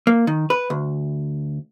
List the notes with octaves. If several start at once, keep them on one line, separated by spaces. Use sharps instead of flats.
A#3
D#3
B4
D2